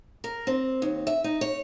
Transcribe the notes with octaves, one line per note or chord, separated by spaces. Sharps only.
A#4
C4
D#2
E5
D#4
C#5